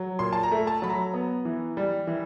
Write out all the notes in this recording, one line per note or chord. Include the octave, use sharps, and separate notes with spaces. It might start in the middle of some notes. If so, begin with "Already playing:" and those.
Already playing: F#3
A#2 C6
A5
A#5
A3
A5
F#3 B5
A#5
B3
E3
G3
E3